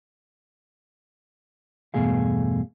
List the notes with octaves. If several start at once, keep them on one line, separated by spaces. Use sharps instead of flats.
E2 G2 B2 A3 G#4 F5